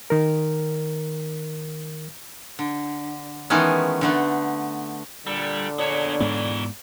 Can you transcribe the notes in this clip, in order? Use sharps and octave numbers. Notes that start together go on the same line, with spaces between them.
D#3 A#4
D3
D#3 E3 G#3 A3 B3 C#4
D3 A3 B3
A#2 D3 G3 A4
A#2 B3 D4 G#4 C#5
G#2 B2 E3 G#3 B3